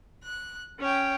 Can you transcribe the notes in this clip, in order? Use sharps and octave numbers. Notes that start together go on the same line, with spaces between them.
F#6
C#4 C#5 G5